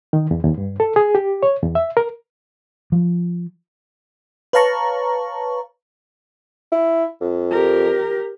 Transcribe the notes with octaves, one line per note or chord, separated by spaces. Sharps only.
D#3
E2
D#2
G2
A4
G#4
G4
C#5
E2
E5
A#4
F3
B4 C#5 F5 A5 A#5 C#6
E4
F2
G4 A#4